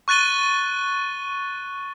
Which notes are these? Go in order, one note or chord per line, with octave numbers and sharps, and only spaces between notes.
C#6 F#6 A6 D#7 G7